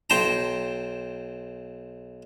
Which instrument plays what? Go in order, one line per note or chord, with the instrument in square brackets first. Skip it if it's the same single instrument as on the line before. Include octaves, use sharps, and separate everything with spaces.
[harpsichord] B1 C5 G5 A5 A#5